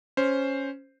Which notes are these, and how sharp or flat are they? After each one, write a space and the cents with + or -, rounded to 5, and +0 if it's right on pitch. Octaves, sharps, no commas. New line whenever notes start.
C#4 +0 C5 +0